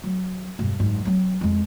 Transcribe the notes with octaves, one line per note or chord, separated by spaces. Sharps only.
F#3
E1 G2
F#1 G#2
F#3 C4
F2 G#3